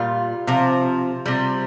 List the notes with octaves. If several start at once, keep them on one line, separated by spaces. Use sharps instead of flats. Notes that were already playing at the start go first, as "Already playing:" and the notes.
Already playing: A#2 G3 F4
C3 F3
C3 G3